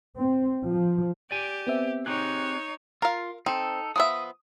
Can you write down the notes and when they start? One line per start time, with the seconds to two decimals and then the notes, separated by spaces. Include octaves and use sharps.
0.18 C4
0.66 F3
1.31 G4 D5 G#5
1.67 B3 C4 E5
2.06 C4 D#4 G4 G#4 C#5 F#6
3.02 F4 A#4 F5
3.46 C4 D#4 A4
3.96 F3 B3 E5 D#6